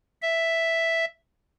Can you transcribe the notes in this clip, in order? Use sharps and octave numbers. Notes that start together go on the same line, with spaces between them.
E5